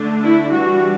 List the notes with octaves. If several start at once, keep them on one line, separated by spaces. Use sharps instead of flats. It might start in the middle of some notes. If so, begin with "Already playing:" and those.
Already playing: D3 A3 D4
E4
E3 G3 D4 F#4